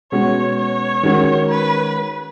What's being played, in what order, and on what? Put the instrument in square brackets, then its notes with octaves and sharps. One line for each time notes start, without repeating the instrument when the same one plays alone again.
[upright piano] B2 G#3 C#4 F#4 [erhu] C#5
[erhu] C#5
[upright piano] D#3 G#3 C#4 F#4
[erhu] B4